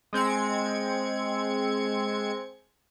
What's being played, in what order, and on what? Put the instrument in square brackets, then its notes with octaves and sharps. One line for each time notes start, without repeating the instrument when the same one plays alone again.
[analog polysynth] G#3 C4 G#6 C#7